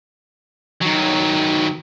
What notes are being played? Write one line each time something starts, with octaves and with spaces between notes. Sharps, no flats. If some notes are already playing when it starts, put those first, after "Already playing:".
D#3 F#3